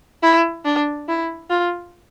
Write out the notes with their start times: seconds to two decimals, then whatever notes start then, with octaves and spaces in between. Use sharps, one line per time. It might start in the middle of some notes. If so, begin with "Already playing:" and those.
0.23 E4
0.65 D4
1.08 E4
1.50 F4